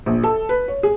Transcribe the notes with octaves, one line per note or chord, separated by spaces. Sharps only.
A#1
A4
B4
C#5
G#4